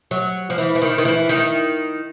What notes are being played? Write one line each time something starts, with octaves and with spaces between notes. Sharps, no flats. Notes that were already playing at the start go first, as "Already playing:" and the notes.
F#3
F3
E3
E3
D#3
D#3
E3
D#3